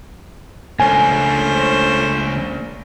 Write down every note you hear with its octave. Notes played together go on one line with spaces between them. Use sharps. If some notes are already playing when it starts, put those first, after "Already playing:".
C#2 A3 A#3 C#4 D4 C5 G#5